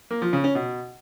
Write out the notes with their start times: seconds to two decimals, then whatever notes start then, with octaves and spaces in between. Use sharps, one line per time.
0.11 A#3
0.22 F3
0.33 C#3
0.44 C#4
0.55 B2